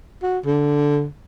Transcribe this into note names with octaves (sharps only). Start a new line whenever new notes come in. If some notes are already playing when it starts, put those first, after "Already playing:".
F#4
D3